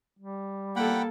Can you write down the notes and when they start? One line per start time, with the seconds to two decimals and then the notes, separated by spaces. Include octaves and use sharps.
0.19 G3
0.76 A#3 A4 F#5 G5 B5